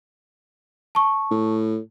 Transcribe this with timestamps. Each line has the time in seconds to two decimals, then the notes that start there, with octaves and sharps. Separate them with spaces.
0.95 A5 C#6
1.31 A2